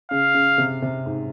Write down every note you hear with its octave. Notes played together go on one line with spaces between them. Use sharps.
C#3 F5
C#3
C3
C3
G#2